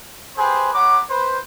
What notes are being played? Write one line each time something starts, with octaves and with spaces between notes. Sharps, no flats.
G4 G#4 B4 C5
G#3 C#5 F#5 A#5 B5 D6
B4 C5